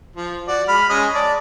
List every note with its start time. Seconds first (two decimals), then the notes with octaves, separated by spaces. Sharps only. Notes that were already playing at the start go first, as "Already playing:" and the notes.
0.16 F3
0.48 F#4 D5
0.68 G#3 B5 F6
0.90 G#3 C#4 D#5
1.14 D5 A5